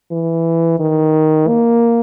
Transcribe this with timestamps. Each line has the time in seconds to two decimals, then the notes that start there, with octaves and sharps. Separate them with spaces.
0.12 E3
0.80 D#3
1.48 A#3